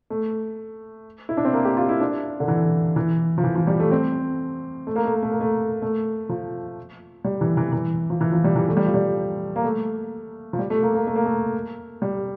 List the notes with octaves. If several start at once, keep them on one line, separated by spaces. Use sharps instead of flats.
A3
E4
D4
C4
A#3
G4
F4
E4
D4
D3
E3
E3
F3
E3
F3
G3
A3
C4
A3
A#3
A3
A#3
A3
A#3
A3
A3
F3
G3
E3
E3
E3
F3
E3
F3
G3
E3
A3
G3
F3
G3
A#3
A3
F3
G3
A3
A#3
A#3
A3
A#3
A3
G3